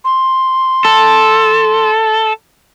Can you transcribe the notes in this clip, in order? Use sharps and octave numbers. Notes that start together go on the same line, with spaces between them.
C6
A4